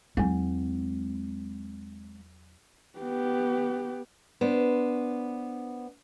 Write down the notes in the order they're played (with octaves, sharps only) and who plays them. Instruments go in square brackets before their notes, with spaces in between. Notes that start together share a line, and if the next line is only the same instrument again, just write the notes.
[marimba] E2 F#3 [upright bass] G#3 C4
[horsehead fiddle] B3 G4
[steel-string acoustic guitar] B3 D4 C5